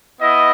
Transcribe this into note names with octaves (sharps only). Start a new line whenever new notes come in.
B3 E4 D#5